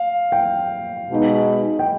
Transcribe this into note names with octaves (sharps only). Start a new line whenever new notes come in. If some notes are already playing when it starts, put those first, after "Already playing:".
Already playing: F5
G5
B2 G#3 B3 D#4
G5